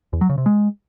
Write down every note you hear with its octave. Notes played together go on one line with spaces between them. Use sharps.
E2
F#3
C#3
C3
G#3